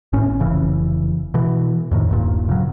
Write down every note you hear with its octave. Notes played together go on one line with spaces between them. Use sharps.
G#1 A2 C#4
F1 C#3 E3
B2 E3
F2 A2 D#3
D#1 G2 A#2
C#3 F#3